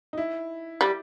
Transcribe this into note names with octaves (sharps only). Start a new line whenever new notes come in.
D#4
E4
G3